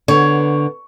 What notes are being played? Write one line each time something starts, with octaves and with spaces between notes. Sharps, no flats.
D3 B3 C#5